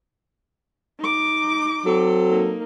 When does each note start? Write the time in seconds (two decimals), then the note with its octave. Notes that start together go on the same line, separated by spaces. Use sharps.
0.99 D#4 D6
1.85 F#3 C4 A4
2.30 A#3 D#4